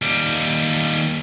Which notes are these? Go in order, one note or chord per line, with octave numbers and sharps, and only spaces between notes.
D#2 G3